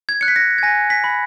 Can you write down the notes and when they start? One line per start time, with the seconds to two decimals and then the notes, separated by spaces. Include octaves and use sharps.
0.09 G#6
0.21 F#6 C#7
0.28 B6
0.36 A#6
0.58 G#6
0.63 G#5 A#6
0.90 B6
1.04 B5